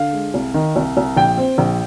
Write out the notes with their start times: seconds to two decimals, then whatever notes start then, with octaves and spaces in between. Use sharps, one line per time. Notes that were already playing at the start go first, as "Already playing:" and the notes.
Already playing: D3 F5
0.13 G#3
0.34 C2
0.54 D#3
0.76 C2
0.97 C2
1.17 A#1 G5
1.37 C4
1.58 A#1